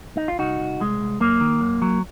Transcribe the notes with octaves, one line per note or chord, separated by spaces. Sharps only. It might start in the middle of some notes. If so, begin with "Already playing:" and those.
D#4
F4
C2 D#4 F#4
C2
C2 G#3
C2
F#2 A#3
D#3
F#2
F#3